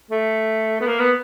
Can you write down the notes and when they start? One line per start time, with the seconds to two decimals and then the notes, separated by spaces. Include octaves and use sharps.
0.11 A3
0.80 B3
0.87 A#3
0.99 B3